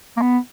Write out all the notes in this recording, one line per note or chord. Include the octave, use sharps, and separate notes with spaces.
A#3
B3